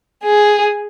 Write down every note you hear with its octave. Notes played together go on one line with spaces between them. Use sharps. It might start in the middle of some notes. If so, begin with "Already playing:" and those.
G#4